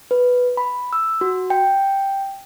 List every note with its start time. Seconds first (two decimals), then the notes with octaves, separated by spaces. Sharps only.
0.11 B4
0.57 B5
0.93 E6
1.21 F#4
1.50 G5